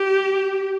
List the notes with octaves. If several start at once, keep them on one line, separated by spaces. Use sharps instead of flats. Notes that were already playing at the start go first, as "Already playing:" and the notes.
Already playing: G4